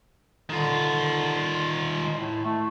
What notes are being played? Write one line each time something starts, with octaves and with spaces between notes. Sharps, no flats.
D3 D#3 F4
G#3
A2
A3